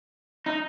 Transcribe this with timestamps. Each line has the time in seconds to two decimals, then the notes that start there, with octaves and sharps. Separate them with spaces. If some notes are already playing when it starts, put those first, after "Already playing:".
0.46 D#4